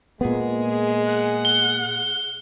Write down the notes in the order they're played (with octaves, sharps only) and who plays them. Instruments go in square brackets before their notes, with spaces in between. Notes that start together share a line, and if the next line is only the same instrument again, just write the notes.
[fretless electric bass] A#2 B3 [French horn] G#3 [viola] G#4
[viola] G#4 F#5
[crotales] G7